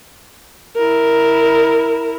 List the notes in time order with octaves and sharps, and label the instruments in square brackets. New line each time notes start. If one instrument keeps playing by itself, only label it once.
[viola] E4 A#4